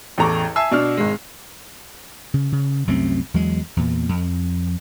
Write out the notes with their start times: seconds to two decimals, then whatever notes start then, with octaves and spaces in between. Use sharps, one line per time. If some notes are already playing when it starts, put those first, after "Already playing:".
0.18 A1 E2 A4 A#5 C#6 D6
0.56 E5 G#5 A5 E6 C7
0.71 B2 D4 F6
0.97 G#1 G#3
2.34 C#3
2.52 C#3
2.87 C2 F#2 A3 C4
3.34 E2 F#3 G#3
3.77 E2 A#2
4.09 F2